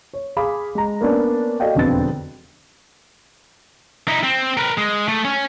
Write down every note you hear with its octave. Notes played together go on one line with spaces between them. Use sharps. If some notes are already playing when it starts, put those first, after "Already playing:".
C#5
G#4 F5 B5 D6
G#3 A#5
A#3 B3 C#4 D4
F#4 A4 D5 D#5 F5 G5
E1 F2 D3 B3 C4 A6
D#4 E4
C4
A#4 B4
G#3
A3
C#4